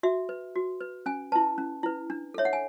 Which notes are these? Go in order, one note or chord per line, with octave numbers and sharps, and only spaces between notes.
F#4 E5
B4
F#4
B4
C#4 G#5
E4 B4 A5
C#4
E4 B4
D4
A4 C#5 E5
F#5
G#5